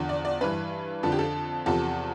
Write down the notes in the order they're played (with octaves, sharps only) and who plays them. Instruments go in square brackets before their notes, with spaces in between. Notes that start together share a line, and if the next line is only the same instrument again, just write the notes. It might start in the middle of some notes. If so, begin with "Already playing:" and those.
Already playing: [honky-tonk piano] E2 D3 F3
D5
D5
G2 E3 B4
F2 D3 F3 A4
G4
A4
E2 C3 F3 A4